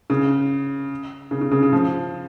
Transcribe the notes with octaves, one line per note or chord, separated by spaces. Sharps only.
C#3
C#3
C#3
C#3
C#3
F3